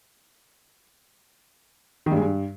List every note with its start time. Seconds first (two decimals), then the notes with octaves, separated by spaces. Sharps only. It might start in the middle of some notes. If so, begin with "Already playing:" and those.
2.06 D#3
2.11 G2
2.17 G#3
2.22 G2